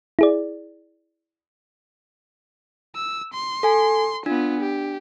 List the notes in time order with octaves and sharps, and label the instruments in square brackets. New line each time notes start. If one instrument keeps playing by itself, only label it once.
[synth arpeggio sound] E4 G#4 D5
[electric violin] E6
C6
[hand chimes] A4 G#5
[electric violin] B3 F4 [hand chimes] D4
[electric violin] G4